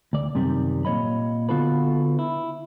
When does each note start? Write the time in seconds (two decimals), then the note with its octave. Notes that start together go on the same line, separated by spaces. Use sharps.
0.13 D2 D5
0.35 F#2 C3 D#3 G3
0.85 A#2 F3 C#5 D#5 B5
1.49 D3 B3 F4 F#4 A4 B4
2.19 E4